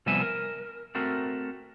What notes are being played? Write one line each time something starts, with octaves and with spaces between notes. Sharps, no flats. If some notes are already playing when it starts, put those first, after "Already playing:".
C3 F3 G3 B3 E5 G#5
A#4
A3 C4 F#4 A#4